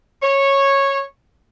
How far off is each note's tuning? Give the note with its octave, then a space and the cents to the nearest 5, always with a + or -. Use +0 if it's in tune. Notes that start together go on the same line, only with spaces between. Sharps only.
C#5 -10